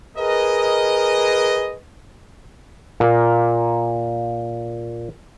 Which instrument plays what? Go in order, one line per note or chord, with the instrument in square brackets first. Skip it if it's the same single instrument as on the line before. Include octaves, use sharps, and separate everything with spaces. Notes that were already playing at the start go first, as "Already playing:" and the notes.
[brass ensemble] G#4 A#4 B4 D#5
[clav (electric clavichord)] A#2 A#3